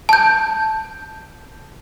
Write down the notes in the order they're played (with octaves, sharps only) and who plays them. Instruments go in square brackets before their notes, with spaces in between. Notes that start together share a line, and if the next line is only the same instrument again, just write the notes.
[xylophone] A5 G6